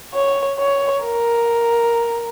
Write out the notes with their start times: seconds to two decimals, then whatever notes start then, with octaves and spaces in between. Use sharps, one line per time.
0.14 C#5
0.59 C#5
1.04 A#4